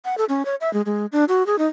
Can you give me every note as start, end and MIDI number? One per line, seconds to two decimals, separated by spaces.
0.05 0.15 78
0.18 0.25 69
0.29 0.45 61
0.45 0.55 73
0.61 0.72 76
0.73 0.82 56
0.86 1.06 56
1.12 1.25 62
1.28 1.46 66
1.46 1.58 68
1.59 1.66 63